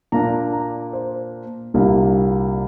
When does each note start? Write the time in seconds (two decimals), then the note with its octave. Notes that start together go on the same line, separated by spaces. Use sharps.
0.12 A#2 A#3 D4 A#5
0.53 A#5
0.93 C5
1.74 C2 A#2 G3 A#3 D4